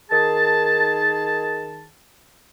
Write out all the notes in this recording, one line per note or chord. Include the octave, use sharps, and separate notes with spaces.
D#3 G#4 A5